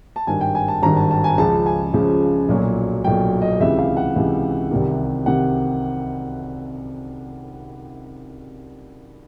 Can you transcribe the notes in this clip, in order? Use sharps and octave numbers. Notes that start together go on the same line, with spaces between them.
A5
G#1 G2 D#3 G#5
G5
G#5
A5
G#1 G2 D#3 A#5
A5
A5
G#5
C#2 C#3 F3 A5
G#5
C#2 C#3 F3
B1 A#2 F#3
B1 A#2 F#3 G5
D#5
C#2 C3 E3 E5
F5
F#5
C#2 C3 E3
C2 C3 D#3
C3 D#3 F#5